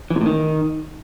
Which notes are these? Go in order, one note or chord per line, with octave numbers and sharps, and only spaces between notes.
E3
C3
A2
D#3